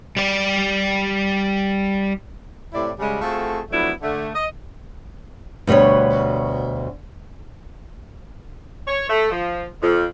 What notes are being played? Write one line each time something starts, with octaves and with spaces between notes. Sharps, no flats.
G3 D5
A2 C3 E4 D5
C#3 G3 G#3
A3 C4 F4 F#4 G#4 A4
F3 F#3 A3 B3 D4 E4
D3 A3
D#5
D2 B2 G3 B3 C#5
C#5
A3
F3
F2